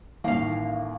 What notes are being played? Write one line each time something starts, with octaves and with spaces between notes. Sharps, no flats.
A1 D#2 A#3 F5